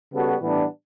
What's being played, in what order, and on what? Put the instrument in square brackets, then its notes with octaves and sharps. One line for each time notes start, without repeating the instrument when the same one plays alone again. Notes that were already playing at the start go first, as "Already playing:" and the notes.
[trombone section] C#3 G3 B3 F#4 A4
A2 E3 G3 B3 D4